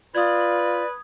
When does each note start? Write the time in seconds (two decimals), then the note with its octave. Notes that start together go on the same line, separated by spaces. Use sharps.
0.15 F4 B4 D5 D#6 G#6